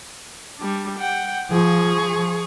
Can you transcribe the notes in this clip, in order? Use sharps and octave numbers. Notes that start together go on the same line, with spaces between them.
G3 D4
F#5 G5
F3 G#4 C#6